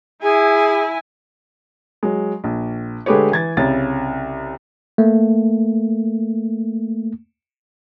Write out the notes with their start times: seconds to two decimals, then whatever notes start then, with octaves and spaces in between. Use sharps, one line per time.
0.23 E4 G#4 G#5
2.03 F#3 G#3
2.44 A#1
3.06 D3 G#3 A3 G4 B4 C#5
3.32 E3 G#6 A6
3.57 C2 C#3 A6
4.98 A3 A#3